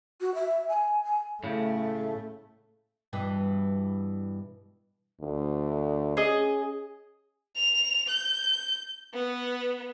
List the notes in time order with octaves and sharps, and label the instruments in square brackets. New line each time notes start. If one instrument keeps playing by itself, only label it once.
[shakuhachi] F#4
E5
G#5
G#5
[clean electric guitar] A2 C#3 [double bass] A3
[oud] G2 B2 E3
[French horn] D2
[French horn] C#4 [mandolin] G#4 D#5
[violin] F7
G6
B3